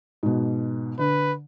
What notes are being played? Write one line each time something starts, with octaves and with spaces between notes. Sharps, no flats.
G#2 B2
D3 B4